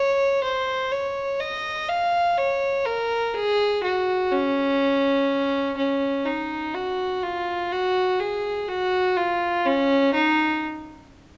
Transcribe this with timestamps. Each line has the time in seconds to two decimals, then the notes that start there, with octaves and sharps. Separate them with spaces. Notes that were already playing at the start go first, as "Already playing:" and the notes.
Already playing: C#5
0.43 C5
0.92 C#5
1.40 D#5
1.88 F5
2.37 C#5
2.85 A#4
3.34 G#4
3.83 F#4
4.31 C#4
5.77 C#4
6.26 D#4
6.74 F#4
7.23 F4
7.72 F#4
8.20 G#4
8.69 F#4
9.17 F4
9.66 C#4
10.14 D#4